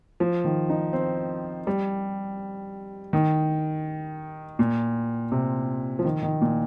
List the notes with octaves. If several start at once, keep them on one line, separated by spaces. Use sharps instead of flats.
F3
D#3
D#4
C4
G3
D#3
A#2
C3
F3
D#3
D#3
A#2